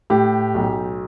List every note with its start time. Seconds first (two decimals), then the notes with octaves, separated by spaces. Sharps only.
0.10 A2 G4
0.55 B1